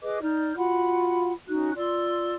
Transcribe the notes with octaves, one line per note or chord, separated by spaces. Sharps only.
G#4 B4 D#5 D6
D#4 D5 F6 G6
F4 F#4 F#5 B5
C#4 D#4 F#4 F#6
F4 D5 C6 E6